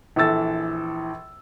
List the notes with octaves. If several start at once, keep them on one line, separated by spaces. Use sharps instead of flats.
A#1 E3 A4 E6 A6